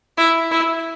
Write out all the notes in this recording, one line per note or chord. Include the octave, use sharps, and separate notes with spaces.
E4
E4